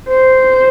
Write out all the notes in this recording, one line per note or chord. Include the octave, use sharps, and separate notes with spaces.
C5